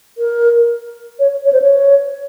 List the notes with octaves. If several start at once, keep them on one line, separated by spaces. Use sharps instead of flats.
A#4
C#5
C#5
C5
C#5